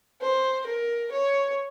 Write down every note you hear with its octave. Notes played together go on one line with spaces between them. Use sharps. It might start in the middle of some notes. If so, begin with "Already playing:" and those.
C5
A#4
C#5